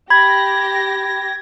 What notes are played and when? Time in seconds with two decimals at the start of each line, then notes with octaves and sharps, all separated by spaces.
0.10 G4 B5 G#6 A#6